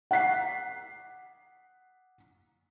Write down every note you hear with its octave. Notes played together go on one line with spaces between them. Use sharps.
F#5 F#6 B6 C7